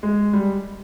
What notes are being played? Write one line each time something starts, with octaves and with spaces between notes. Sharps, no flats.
G#3
G3